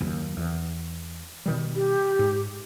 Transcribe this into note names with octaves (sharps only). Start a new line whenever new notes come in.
F#1 D#2
E2
B2 D#3 G3
G4
G#2